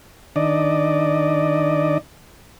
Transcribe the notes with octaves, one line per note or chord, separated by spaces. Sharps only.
D#3 D4 D5 D#5